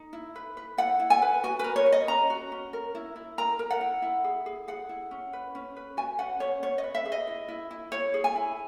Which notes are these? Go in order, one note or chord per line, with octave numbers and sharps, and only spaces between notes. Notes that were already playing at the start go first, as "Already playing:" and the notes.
Already playing: D#4
E4
B4
B4
E4 F#5
E4
G#5
B4
F#4 G#5
A#4 B4
C#5
A#4
D#5
C#4 A#5
F#4
C#4
A#4
E4
E4
A#4 A#5
A#4
F#5
E4
E4
G#4
G#4
G#4 F#5
E4
C#4
B4
C#4
B4
F#4 G#5
C#4 F#5
C#4 C#5
C#4 C#5
D#5
B4
E5
G#4
D#5
E4
E4
E4
E4 C#5
G#4
G#5
E4